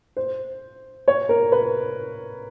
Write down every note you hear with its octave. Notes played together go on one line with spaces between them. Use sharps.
C5
C#5
A#4
B4